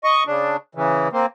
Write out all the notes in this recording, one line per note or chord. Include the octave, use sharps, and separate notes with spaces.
D#5 C#6
C#3 D4
C#3 E3
A#3 C4